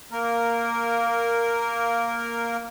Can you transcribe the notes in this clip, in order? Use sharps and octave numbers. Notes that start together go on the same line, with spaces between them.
A#3 A#4